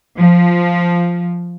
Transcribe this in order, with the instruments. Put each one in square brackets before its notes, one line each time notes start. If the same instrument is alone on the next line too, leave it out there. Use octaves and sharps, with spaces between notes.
[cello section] F3